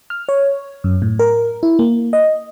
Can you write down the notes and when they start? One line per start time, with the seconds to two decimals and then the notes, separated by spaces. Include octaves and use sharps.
0.10 F6
0.29 C#5
0.84 F#2
1.02 A2
1.19 A#4
1.63 E4
1.79 A#3
2.13 D#5